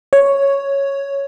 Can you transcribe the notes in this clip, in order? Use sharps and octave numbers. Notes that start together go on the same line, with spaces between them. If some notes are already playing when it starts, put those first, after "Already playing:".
C#5